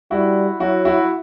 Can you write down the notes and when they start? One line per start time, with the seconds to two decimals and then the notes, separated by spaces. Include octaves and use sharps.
0.11 G3 E4 F#4
0.60 F#3 E4 F#4
0.85 E4 F#4